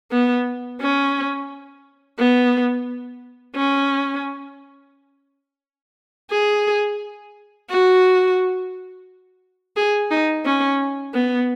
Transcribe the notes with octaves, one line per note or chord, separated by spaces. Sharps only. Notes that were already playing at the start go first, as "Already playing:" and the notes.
B3
C#4
B3
C#4
G#4
F#4
G#4
D#4
C#4
B3